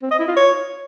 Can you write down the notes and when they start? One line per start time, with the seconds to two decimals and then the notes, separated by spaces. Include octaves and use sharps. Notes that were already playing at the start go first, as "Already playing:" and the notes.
0.02 C4
0.11 D#5
0.19 E4
0.28 F4
0.36 C#5